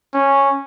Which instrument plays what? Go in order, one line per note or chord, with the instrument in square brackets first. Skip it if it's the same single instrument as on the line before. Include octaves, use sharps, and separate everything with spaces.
[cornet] C#4